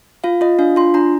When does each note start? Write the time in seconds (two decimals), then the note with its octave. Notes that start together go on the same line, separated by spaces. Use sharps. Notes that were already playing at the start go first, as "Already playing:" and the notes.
0.24 F4 F5
0.41 F4 D#5
0.59 D4 F5
0.76 F4 C6
0.94 D4 A#5